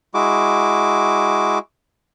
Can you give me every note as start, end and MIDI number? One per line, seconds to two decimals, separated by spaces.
0.14 1.59 56
0.14 1.59 64
0.14 1.59 66
0.14 1.59 86